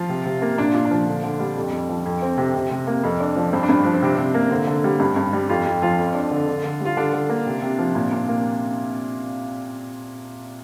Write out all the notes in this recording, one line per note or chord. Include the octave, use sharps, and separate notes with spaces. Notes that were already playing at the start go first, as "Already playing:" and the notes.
Already playing: F3 F4
C3
C3
A#3
A#2 D4
A#2 F4
D4
F3
D3
D3
G3
F2
F2
F3
F2
C4
C3
C3
C3
A#3
F2
D4
F3
G2 C4
D4
G2 C4
F3 D4
C4
C3 D4
C3 C4
A#3
D3 C4
D3
G3
G2
G2
G3
F2 F4
F2 F4
F3 F4
F2
D4
D3
D3
D3
G3
F4
D3 D4
D3
A#3
C3
C3
F3
A#2
A#2
A#3